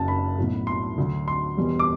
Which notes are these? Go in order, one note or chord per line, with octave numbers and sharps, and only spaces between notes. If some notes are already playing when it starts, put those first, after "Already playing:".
Already playing: F#1 F#2 F#3 A5
B5
B1 A2 F#3
C6
D2 D3 F#3
C6
E1 E2 B2 G3
D6